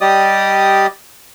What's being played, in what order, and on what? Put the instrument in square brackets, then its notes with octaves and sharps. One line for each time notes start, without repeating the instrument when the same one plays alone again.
[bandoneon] G3 G4 D5 D#5 D#6